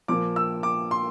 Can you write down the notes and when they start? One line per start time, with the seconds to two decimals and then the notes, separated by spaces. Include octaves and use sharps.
0.08 A#2 F3 A#3 D6
0.36 E6
0.63 D6
0.91 C6